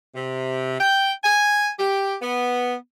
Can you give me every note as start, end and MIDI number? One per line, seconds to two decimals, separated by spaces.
0.15 0.77 48
0.80 1.11 79
1.23 1.69 80
1.79 2.16 67
2.21 2.74 59